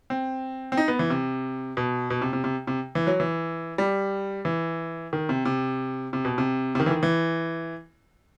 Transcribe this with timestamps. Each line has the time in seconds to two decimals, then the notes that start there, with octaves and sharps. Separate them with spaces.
0.10 C4
0.72 C4
0.77 D#4
0.88 B3
0.99 E3
1.10 C3
1.77 B2
2.10 B2
2.22 C3
2.33 C3
2.44 C3
2.67 C3
2.95 E3
3.07 F#3
3.20 E3
3.78 G3
4.45 E3
5.13 D#3
5.29 C3
5.45 C3
6.13 C3
6.25 B2
6.38 C3
6.75 C3
6.80 D#3
6.86 E3
6.91 D#3
7.03 E3